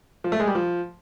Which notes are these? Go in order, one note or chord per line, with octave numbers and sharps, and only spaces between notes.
F3
A3
G#3
G3
F3